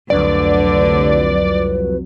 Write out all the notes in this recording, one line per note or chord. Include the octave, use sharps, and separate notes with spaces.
C2 F2 D3 F#3 A3 B4 D5